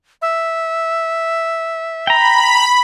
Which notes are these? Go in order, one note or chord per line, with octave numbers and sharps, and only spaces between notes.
E5
G5 A#5 B5